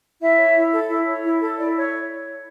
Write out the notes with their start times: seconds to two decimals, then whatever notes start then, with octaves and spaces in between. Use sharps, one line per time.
0.21 E4 E5
0.38 C#5
0.56 E4
0.73 A4
0.89 E4
1.07 C#5
1.23 E4
1.41 A4
1.58 E4 D5
1.76 C#5